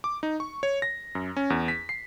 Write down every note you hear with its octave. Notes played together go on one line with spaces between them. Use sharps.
D6
D#4
C#6
C#5
A#6
F#2
C#4
E2
B6
C7